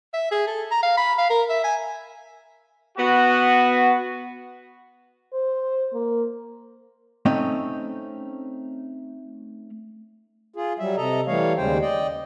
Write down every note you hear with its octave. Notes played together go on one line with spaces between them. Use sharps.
E5
G#4
A4
A#5
F5
B5
F5
A#4
E5
G#5
B3 F#4
C5
A#3
A3 C4 C#4 D#4 C#5 D#5
F4 G#4
F#3 G3 E5
C3 A4 D#5 A#5
E3 G3 A3 C#5 F5
D#2 C#3 G3 G#3 C5 G5
D5 D#5 G5